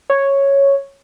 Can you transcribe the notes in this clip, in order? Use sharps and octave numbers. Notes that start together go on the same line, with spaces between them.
C#5